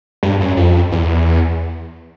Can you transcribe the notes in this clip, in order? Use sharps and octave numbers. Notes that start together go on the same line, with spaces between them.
G2
F#2
F2
E2